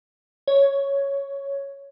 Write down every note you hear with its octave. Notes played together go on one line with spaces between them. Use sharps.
C#5